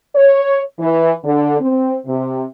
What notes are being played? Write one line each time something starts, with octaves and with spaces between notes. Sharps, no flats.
C#5
E3
D3
C4
C3